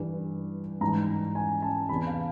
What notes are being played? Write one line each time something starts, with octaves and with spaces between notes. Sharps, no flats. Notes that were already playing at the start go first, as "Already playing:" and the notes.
Already playing: G2 E3
G#2 E3 A#5
G#5
A5
E2 C3 E3 B5
F5